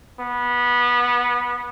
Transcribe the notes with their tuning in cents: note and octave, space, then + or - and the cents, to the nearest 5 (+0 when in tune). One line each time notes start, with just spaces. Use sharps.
B3 -20